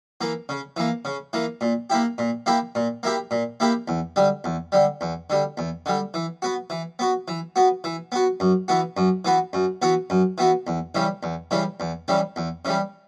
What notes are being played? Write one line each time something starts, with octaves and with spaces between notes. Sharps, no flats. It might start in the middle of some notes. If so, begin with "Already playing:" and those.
E3 A#3
C#3
E3 A#3
C#3
E3 A#3
A#2
A#3 E4 G4
A#2
A#3 E4 G4
A#2
A#3 E4 G4
A#2
A#3 E4 G4
E2
D3 G3
E2
D3 G3
E2
D3 G3
E2
D3 G3
E3
B3 F#4
E3
B3 F#4
E3
B3 F#4
E3
B3 F#4
F#2
E3 B3 F#4
F#2
E3 B3 F#4
F#2
E3 B3 F#4
F#2
E3 B3 F#4
E2
C#3 E3 G3
E2
C#3 E3 G3
E2
C#3 E3 G3
E2
C#3 E3 G3